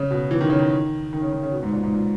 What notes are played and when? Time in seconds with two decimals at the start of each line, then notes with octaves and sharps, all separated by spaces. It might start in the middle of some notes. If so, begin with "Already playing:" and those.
Already playing: C#3
0.11 B2
0.31 E3
0.41 D#3
0.50 C#3
0.59 D#3
1.13 D#3
1.22 C#3
1.32 D#3
1.43 C#3
1.52 B2
1.63 G#2
1.73 A#2
1.83 G#2
1.94 A#2